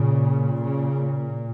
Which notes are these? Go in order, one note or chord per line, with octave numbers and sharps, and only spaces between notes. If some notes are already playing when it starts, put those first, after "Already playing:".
Already playing: A#2 C#3
C#3